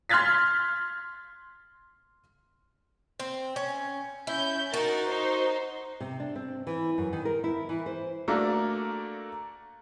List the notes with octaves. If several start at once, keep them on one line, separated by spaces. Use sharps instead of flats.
C6 F6 F#6 G#6 A6 B6
C4
C#4
C#4 E4 G6
D#4 F#4 A#4 A6
D#4 C5
C3
D4
C4
E3
F#2
D#3
A#4
E4
E3
C5
A3 A#3 D4 F#4 A4 A#4